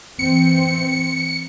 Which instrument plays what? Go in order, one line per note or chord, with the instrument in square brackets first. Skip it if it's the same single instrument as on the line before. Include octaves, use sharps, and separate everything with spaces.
[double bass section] E3 C4 [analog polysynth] C#7